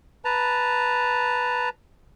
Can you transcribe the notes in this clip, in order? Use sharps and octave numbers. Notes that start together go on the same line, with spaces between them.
B4 A5 A#5